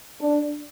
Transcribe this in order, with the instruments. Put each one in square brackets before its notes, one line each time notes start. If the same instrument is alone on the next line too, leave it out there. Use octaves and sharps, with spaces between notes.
[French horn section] D4